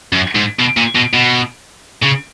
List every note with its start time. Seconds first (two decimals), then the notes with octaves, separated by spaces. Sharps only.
0.13 F#2
0.35 G#2
0.60 B2
0.77 A#2
0.96 B2
1.14 B2
2.02 C#3